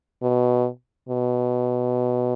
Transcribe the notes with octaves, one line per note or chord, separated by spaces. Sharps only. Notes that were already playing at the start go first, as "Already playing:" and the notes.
B2
B2